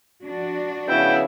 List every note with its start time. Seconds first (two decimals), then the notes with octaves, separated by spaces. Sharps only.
0.23 F3 D4 F#4
0.89 C#3 B3 E4 G5